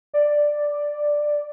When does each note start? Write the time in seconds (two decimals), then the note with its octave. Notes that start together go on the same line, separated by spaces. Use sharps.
0.14 D5